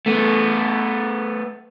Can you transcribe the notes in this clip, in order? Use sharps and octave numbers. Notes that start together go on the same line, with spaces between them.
A3 B3